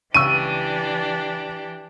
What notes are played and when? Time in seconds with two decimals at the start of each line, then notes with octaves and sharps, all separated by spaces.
0.15 C#2 E3 D4 G4 C#6 E6 D#7